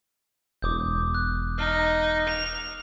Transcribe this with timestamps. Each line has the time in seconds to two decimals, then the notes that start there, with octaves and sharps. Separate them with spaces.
0.62 E1 D6 D#6 G6
1.15 F#6
1.58 D#4 F6 C7
2.29 F7